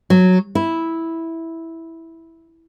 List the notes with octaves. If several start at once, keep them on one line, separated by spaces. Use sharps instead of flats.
F#3
E4